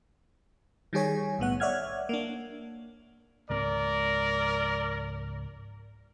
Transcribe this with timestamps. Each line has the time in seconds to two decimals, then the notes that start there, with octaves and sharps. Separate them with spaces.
0.93 D#3 G3 G#4 C#5 G#5
1.38 B1 A2 B3 F#5
1.60 C#5 D5 E5 F#5 F6 G#6
2.09 A#3 D4
3.50 C#2 G#2 C4 A#4 D5